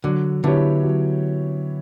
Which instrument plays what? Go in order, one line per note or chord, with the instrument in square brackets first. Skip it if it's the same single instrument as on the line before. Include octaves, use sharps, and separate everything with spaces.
[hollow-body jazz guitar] D3 [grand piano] F#3
[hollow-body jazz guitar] D3 [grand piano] B3 E4 G4 C#5
[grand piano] F#3